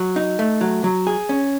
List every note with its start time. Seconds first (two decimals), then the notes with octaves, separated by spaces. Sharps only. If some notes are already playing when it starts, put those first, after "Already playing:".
Already playing: F#3
0.16 D#4
0.39 A3
0.61 F#3
0.84 F#3
1.07 G#4
1.29 C#4